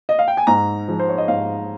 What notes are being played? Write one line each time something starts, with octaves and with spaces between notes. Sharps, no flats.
D#5
F5
G5
G#5
G#2 A#5
F3 G#3
C5
C#5
D#5
G#2 F5